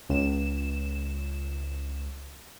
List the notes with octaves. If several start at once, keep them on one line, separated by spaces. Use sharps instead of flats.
C#2 E7